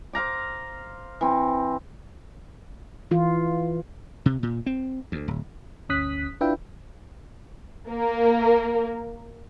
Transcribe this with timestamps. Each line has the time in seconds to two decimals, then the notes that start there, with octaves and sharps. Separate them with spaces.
0.13 C5 F5 A#5 D6
1.21 E3 C4
3.11 E3 F4
4.26 C3
4.43 A#2
4.66 C4
5.12 D2
5.28 D1
5.89 G1 D2 C#4 D#6 F#6 B6
6.41 D4 E4 F4 B4 E5 G5
7.89 A#3 A#4